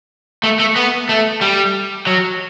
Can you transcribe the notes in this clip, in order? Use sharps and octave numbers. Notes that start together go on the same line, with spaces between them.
A3
A3
B3
A3
G3
F#3